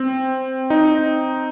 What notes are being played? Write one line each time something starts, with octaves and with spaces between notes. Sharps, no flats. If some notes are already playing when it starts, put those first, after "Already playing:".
Already playing: C4
D#4